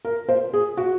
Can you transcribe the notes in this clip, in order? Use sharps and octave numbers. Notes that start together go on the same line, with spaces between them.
A#4
C5
G#4
F#4